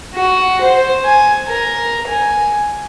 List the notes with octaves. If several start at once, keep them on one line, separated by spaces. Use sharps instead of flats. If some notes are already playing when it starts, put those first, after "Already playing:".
F#4
C5
G#5
A#4
G#5